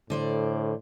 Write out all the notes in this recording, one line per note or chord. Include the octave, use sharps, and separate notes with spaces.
A2 D3 C5 D5